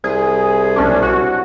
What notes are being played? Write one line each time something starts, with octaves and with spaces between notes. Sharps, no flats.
C2 G#4
B1 C#4 D4
F#4